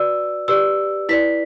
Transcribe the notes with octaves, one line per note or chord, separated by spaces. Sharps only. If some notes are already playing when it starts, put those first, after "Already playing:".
Already playing: F#4 B4 D5 E6
G4 B4 D5 E6
E4 B4 D5 B6